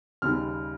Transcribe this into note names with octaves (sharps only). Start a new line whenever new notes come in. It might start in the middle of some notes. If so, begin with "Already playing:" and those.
D#2 C#3 G3 F6